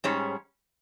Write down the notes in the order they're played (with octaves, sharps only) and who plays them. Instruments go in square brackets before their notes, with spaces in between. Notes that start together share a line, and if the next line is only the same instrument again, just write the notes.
[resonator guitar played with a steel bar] G#2 G3 C#4 G#4 C#5